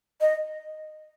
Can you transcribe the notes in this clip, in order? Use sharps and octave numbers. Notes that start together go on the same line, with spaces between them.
D#5